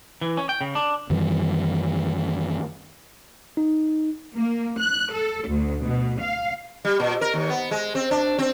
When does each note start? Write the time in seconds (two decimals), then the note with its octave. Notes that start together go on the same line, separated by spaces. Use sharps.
0.21 E3
0.37 C#4
0.49 G5
0.61 C#3
0.75 D4
1.10 F#2 D#3 E3 G3
3.57 D#4
4.36 A#3
4.79 F#6
5.12 A4
5.49 D2
5.84 B2
6.21 F5
6.85 G3
7.00 A#2
7.21 A#4
7.34 D#2
7.49 B3
7.71 G#3
7.95 C4
8.11 D4
8.39 C4